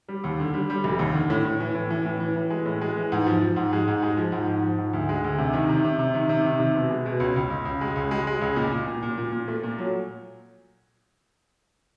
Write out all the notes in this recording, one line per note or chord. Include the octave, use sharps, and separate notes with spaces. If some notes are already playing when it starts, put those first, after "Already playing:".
G3
D#2
D3
G3
G3
F1
D#2
D3
A2
A2
E3
A2
E3
A2
E3
E3
G#3
A2
G#3
E3
G#2
F3
F3
G#2
G#3
G#2
G#3
F3
G#2
G#2
F3
G#2
D2
G#3
D2
C3
D#3
C3
C3
C3
D#3
C3
D#3
C3
B2
G#3
B2
C#2
C#2
C#2
C#2
G#3
C#2
G#3
G#3
C#2
A#2
A#2
A#2
A#2
A#2
A#2
A3
A#2
F#3